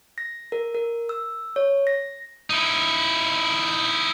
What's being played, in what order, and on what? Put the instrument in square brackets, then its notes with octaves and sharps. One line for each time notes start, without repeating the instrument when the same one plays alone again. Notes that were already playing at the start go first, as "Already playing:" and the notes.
[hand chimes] A#6
A#4
A#4
E6
C#5
A#6
[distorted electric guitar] D#4 E4